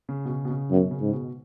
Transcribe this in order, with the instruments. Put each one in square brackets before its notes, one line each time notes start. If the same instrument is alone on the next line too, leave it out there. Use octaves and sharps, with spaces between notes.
[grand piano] C#3
B2
C#3
B2
C#3
[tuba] F#2 [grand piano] B2
[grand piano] C#3
[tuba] G#2
[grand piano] B2